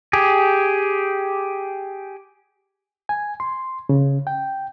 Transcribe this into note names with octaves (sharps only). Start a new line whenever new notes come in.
G4 G#4
G#5
C6
C#3
G5